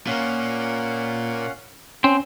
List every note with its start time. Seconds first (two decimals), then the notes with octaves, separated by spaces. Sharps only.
0.07 A#2 A#3 C#4 F5 F#5
2.04 C4 C#4